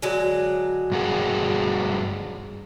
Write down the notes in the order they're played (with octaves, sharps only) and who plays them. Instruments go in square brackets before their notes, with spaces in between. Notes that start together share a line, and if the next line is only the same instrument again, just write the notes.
[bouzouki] D3 F#3 G#3
[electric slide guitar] G2 F#4 G#4